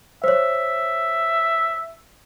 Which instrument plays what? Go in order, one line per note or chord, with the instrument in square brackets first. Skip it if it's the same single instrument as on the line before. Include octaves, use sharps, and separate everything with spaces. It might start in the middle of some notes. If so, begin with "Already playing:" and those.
[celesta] C5 C#5 [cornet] E5